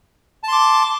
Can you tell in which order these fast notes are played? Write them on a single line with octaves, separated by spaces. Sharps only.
A5 C6 D6